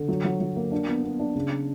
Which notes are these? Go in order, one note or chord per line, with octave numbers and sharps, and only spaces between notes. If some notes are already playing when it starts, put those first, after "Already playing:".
Already playing: D3
F#3
F#3
F#3
A#3
D4
B3
B3
D4
C#3